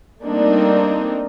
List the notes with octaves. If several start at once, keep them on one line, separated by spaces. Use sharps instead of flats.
G3 A3 A#3 C4 D4 D#4